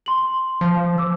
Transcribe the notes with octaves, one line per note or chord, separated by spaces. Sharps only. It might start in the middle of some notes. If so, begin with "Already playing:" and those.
C6 F#7
F3
D6 E6